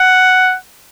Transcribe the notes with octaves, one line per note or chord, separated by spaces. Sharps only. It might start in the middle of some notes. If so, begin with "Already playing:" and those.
Already playing: F#5